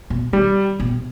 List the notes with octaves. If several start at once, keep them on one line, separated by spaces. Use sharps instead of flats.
B2
D#3 G3
B2